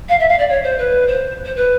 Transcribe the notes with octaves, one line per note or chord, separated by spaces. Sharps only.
F5
E5
F5
D5
C#5
C5
B4
C5
C5
B4